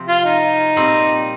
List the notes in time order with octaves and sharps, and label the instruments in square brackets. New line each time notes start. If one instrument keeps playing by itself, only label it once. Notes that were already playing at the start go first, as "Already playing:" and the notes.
Already playing: [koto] C3 F3 C4
[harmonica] F4
D#4
[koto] A#2 G3 C4